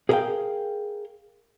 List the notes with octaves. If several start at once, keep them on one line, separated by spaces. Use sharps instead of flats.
G#4 A#4 B4 E5 F5 G5